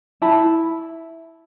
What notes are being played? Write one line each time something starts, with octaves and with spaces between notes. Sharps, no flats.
E4 A5 B5